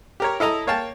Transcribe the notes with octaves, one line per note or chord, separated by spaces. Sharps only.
G4 A#4 C#5
E4 A4 D#5 A#5
A#3 C#5 F5 G5 A5